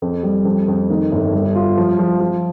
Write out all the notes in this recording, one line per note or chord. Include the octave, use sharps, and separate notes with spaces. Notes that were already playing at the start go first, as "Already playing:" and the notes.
F2
G3
F2
F2
D#3
G1
G3
F4
F3
F3
F3